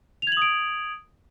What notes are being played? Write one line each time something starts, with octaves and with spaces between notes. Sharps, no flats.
D#6 G#6 D7 F7 F#7